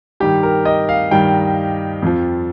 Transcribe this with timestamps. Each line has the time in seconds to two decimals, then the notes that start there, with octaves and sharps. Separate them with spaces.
0.20 G2 D#3 G3 G4
0.43 A#4
0.65 D#5
0.89 F5
1.11 G2 D#3 G3 G5
2.02 F2 F3